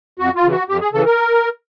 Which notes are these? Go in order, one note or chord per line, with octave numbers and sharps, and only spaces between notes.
F2 F#4
F4
C#3 E3
F#4
F2 G4
G#4
C#3 E3 A4
A#4